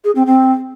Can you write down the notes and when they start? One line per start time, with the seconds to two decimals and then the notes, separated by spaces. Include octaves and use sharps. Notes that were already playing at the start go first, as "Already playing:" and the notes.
0.04 G#4
0.15 C4
0.26 C4